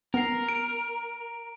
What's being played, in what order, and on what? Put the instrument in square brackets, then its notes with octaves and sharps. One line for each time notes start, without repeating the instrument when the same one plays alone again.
[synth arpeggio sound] B3 C7 [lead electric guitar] A#4
[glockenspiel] D7